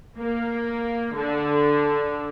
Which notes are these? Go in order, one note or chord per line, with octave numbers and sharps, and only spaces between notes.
A#3
D3